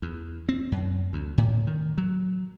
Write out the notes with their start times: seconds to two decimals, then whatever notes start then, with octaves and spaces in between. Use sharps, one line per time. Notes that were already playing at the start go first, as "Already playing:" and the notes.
0.02 E2
0.49 C4
0.72 F#2
1.13 D2
1.38 A2
1.67 D#3
1.98 F#3